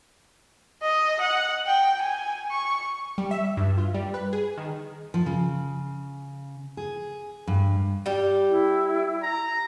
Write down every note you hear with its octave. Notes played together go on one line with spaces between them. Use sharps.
D#5
F#5
G5
G#5
C#6
G3
E5
G2
F4
G3
B4
G#4
D#3
F3
C#3
G#4
G2
G3 G4
E4
A#5